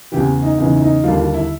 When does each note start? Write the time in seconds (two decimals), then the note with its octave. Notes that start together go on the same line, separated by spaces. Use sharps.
0.12 E2 C#3 E3 G4
0.42 D#4
0.58 E2 C#3 E3 D#4
0.75 E4
0.81 D#4
1.04 D#2 D3 G3 A#3 F4
1.20 F4
1.34 E4